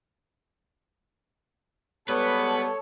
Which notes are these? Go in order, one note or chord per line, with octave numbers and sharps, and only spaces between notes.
G3 G#3 B3 A4 B4 C#5